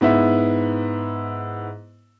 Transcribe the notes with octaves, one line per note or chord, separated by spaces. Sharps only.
G#2 B3 E4 E5